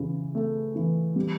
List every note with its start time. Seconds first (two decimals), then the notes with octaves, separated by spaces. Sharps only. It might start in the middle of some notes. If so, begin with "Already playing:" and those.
Already playing: C#3 E3
0.35 A3
0.75 E3
1.16 G3